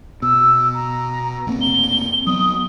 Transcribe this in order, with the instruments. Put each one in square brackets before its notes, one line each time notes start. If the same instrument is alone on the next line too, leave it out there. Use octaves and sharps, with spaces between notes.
[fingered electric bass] B2 [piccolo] E6
[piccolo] A#5
[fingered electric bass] F1 A#3 C4
[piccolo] G7
[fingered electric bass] F#3 B3 [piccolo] D#6